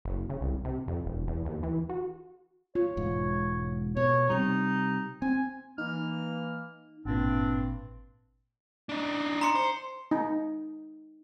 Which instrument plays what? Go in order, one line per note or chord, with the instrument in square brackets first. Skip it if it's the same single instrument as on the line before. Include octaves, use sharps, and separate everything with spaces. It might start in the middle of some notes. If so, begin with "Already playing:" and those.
[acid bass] F#1
C#3
C2
C3
F2
E1
E2
D#2
E3
F#4
[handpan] F4 [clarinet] C#5
[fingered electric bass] E1 G#2
[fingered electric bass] B2 [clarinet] C#5
[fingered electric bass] C3 G3 [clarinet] D#4
[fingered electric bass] C4 [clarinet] G#5
[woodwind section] E3 A#3 F6 [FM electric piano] D#4
[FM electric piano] G#1 A#2 [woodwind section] G2 C4 D4
[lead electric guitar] D4 D#4
[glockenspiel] A#5 C6 C#7
[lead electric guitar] C5
[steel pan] D#4